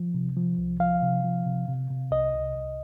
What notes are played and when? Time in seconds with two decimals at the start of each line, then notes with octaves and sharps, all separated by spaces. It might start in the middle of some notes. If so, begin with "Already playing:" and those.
Already playing: F3
0.14 C3
0.36 F3
0.58 C2
0.80 F3 F5
1.02 C3
1.24 F3
1.46 C3
1.68 C3
1.90 C3
2.12 C2 D#5
2.33 C2
2.56 C2